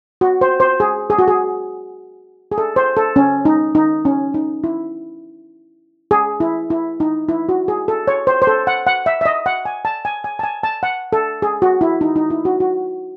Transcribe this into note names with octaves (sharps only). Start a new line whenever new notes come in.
F#4
C5
C5
G#4
G#4
F#4
G#4
G#4
A4
C5
A4
C#4
D#4
D#4
C#4
D#4
E4
G#4
E4
E4
D#4
E4
F#4
G#4
A4
C#5
C5
C5
A4
F#5
F#5
E5
E5
D#5
F#5
G#5
A5
G#5
G#5
A5
G#5
A5
F#5
A4
G#4
F#4
E4
D#4
D#4
E4
F#4
F#4